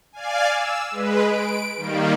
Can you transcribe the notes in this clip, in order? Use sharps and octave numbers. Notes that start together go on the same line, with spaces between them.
D5 F5 G#5
E6
G#3 B4
D7
D#3 G3 A#3